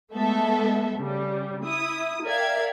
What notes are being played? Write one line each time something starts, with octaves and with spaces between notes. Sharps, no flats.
G#3 A3 B3 A4 E5
C#3 G3
E4 D#6
A#4 D5 E5 F5 G5 G#6